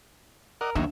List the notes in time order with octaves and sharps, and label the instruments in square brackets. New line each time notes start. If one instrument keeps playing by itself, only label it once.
[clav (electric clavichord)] A#4 [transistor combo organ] D5 D#5 F#5
[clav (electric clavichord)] D#2 E5 [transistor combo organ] F#3 A#3 D#4 [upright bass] D4